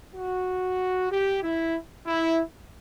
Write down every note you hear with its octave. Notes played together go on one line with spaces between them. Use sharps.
F#4
G4
E4
E4